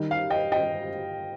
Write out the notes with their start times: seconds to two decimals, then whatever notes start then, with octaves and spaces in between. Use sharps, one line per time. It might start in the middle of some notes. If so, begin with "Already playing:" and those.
Already playing: D#3 G3 D#4
0.11 F5
0.30 D#5 G5
0.52 D#5 G5